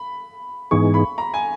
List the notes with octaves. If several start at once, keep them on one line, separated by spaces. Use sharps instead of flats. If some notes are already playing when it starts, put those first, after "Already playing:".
Already playing: B5
G#2 E3 B3 D#4 G#4 C#6
B5
A#5
G#5